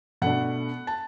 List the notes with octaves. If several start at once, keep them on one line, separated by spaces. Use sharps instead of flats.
B2 A3 D4 F#5
A5